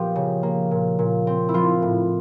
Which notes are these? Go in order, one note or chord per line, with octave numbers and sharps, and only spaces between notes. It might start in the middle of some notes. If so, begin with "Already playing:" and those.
Already playing: A#2 F3 B3 G4
C#3
A#3
A#2
A#2
C4
E4
F3 F4
A2